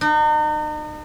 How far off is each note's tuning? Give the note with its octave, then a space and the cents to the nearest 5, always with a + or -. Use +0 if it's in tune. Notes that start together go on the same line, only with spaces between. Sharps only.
D#4 -40